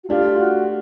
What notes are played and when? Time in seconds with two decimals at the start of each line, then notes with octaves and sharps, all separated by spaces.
0.04 F#4
0.08 A3 D4 F4 G4
0.38 F#4